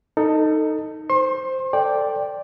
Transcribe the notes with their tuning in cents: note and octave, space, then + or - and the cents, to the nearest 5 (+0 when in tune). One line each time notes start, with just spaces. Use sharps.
D#4 +0 A4 +20
C5 +0 C6 +40
A4 +20 D5 +0 G5 +5